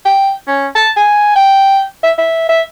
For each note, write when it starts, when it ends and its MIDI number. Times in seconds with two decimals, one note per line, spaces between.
0.05 0.32 79
0.47 0.67 61
0.75 0.90 81
0.96 1.33 80
1.35 1.83 79
2.03 2.12 76
2.18 2.44 76
2.48 2.61 76